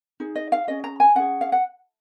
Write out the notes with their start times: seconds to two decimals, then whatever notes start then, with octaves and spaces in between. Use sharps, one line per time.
0.20 D#4 G#4
0.35 D#5
0.52 F5
0.67 C#4 G#4 D#5
0.84 A#5
1.00 G#5
1.15 C#4 G#4 F#5
1.41 F5
1.52 F#5